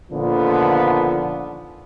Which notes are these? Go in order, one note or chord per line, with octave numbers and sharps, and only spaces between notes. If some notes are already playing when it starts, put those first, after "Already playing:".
A#2 D3 D#3 F3 B3